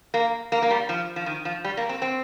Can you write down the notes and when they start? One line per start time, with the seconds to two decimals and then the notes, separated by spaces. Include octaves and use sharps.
0.14 A#3
0.52 A#3
0.62 A#3
0.71 G3
0.89 F3
1.16 F3
1.26 D#3
1.45 F3
1.64 G3
1.77 A#3
1.89 C4
2.02 C4